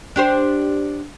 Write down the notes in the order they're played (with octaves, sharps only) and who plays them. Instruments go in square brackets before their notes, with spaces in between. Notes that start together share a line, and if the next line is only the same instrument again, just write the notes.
[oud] D4 G4 C5